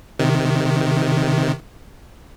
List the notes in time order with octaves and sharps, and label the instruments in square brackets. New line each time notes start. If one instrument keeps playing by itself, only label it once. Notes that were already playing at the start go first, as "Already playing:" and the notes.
[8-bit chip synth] C3 D#3